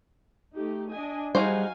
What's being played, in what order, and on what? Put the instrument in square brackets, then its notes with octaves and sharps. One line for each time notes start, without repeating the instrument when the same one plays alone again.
[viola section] A3 D#4 G4
D4 D#5 G#5
[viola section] F#3 F5 G#5 [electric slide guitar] G3 G#4 [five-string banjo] D#4 F#4 C5